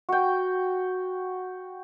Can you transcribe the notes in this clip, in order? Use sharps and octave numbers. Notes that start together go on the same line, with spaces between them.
F#4 G5